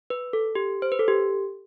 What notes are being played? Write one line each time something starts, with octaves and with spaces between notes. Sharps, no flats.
B4
A4
G4
C5
B4
A4
G4